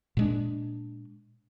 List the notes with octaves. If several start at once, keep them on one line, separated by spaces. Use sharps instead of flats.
A#2 G#3 D4